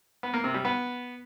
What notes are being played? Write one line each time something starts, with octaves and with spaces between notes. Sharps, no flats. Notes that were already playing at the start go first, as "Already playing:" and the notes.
B3
A#3
C3
G3
B3